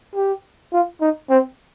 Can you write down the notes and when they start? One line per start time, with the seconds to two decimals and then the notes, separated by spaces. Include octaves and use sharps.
0.15 G4
0.72 F4
1.01 D#4
1.30 C4